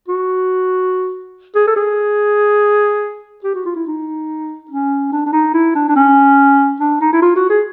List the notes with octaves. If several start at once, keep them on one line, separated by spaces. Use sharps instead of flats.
F#4
G#4
A4
G#4
G4
F#4
F4
E4
D#4
C#4
D4
D4
D#4
E4
D4
D4
C#4
D4
D#4
E4
F4
F#4
G#4